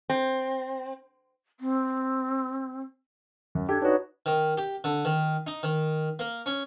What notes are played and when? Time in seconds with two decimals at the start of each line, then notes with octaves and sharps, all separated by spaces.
0.10 C4
1.60 C4
3.55 F#2
3.68 D4 G4 A4 G#6
3.82 D4 D#4 F#4 B4 C#5
4.26 D#3
4.57 G4
4.84 D3
5.05 D#3
5.47 D#4
5.63 D#3
6.19 A#3
6.46 C#4